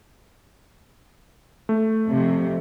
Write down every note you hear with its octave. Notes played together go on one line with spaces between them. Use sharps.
A3
F2 C3